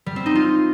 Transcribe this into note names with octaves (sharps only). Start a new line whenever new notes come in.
G3
C4
D#4
F4